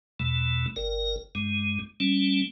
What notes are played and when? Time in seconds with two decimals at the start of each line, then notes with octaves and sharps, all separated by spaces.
0.20 E2 B2 A3
0.76 G1 A#4
1.35 G2 G#3
2.00 G3 A3 C#4